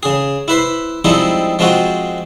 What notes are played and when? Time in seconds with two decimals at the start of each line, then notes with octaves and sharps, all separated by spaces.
0.03 C#3 G#4
0.48 E4 B4 C5
1.04 F3 G3 G#3 C4 D#4 E4
1.59 F3 G#3 C4 F4 F#4